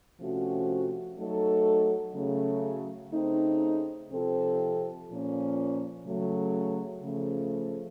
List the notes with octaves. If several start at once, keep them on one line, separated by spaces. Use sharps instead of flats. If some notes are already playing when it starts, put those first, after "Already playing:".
C3 F3 A3 C#4 F#4
F#3 A3 D#4 A4
C#3 F#3 A3
C#3 A3 C4 D#4
C3 F3 C4 F4 A4
A#2 F3 A#3 C#4
C#3 F#3 A3
C#3 F3 A3